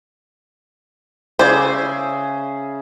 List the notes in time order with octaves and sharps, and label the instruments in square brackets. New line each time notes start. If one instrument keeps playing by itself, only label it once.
[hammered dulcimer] C#3 G#4 E5 [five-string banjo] C5 D5